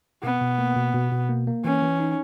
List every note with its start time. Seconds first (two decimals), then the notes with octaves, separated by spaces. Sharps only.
0.23 B2 B3
0.41 B2
0.59 A#3
0.76 B2
0.94 B2
1.11 B2
1.29 A#3
1.47 A#3
1.64 E3 C#4
1.82 E3
2.00 D#4